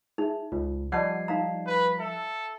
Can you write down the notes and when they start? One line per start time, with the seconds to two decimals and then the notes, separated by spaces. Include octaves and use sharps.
0.18 D#4 G#4 E5
0.52 C#2 F4
0.92 F3 G3 D5 D#5 F#5 A5 G#6 C7
1.28 D#4 F5 A#5
1.67 B4
1.99 A4 E5